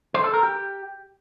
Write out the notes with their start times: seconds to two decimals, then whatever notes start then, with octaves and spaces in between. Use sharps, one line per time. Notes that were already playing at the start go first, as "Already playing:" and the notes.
0.14 C5
0.24 A4
0.33 A#4
0.43 G4